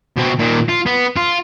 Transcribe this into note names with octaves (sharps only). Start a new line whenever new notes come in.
B2 C4
A#2 D#3
F4
B3
F4